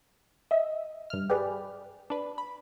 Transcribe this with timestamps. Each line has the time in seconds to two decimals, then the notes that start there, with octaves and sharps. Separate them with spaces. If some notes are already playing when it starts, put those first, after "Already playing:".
0.51 D#5 E5
1.10 G2 F6
1.30 G4 G#4 B4 D5
2.10 D4 B4
2.38 B5